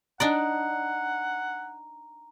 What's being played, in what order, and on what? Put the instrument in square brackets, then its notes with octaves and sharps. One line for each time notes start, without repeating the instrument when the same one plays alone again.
[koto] D4 D#4 D5 [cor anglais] F#5 [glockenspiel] A#5